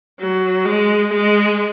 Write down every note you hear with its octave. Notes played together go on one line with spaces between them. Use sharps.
F#3
G#3
G#3